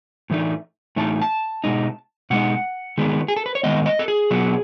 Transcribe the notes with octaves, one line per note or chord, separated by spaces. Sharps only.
A2 E3 A3 D#4
A2 E3 A3 D#4 A5
A5
B2 G#3 D#4
B2 G#3 D#4 F#5
D#3 G#3 B3
G#4
A4
B4
C#5
D#3 G#3 B3 D#5
D#5
A4
G#4
B2 F#3 B3